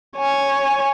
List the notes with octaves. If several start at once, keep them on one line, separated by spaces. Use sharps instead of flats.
C#5 G#5